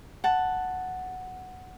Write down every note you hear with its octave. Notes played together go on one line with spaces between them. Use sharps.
F#5 A5